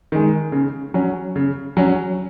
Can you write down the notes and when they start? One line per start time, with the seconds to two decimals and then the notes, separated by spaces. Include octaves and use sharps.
0.12 D#3 G#3
0.52 C#3
0.94 F#3 C#4
1.36 C#3
1.77 F#3 C#4